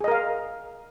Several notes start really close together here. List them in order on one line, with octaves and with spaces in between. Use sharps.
G#4 D#5 A#4 F5